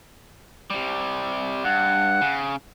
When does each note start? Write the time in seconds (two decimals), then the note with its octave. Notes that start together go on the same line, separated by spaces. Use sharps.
0.70 C3 G3
1.64 G2 F#5
2.22 C#3